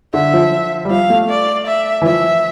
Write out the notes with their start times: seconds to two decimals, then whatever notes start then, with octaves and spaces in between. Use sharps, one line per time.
0.14 D3 E5
0.34 F3
0.85 G3
0.90 F3 F5
1.10 A3
1.30 D5
1.67 E5
2.02 E3
2.06 F3 E5